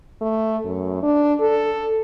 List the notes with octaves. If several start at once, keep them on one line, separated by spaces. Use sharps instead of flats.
A3
F#2
D4
A4